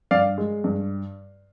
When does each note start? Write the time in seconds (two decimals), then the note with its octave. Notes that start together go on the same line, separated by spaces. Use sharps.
0.11 G2 D5 F5
0.38 G#3
0.64 G2